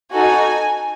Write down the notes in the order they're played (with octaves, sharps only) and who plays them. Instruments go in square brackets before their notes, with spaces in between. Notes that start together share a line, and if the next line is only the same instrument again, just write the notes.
[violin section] D#4 F#4 A4 G#5